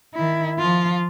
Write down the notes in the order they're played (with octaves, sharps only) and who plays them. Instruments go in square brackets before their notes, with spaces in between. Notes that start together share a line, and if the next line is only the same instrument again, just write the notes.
[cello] D#3 E4
F3 F4